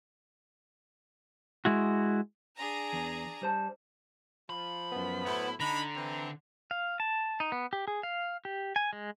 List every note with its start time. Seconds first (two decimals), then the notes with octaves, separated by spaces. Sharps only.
1.65 G#3 E4 F#4
2.56 D4 G#4 A#5
2.93 E2
3.41 G3 C5 A5
4.50 F3 B5
4.92 F#2 B3
5.25 A2 F#3 B3 E4 C5
5.60 D3 D4 D#4 A#5 B5
5.94 E3 C4
6.71 F5
7.00 A5
7.40 D#4
7.52 B3
7.73 G4
7.88 G#4
8.03 F5
8.45 G4
8.76 G#5
8.93 G#3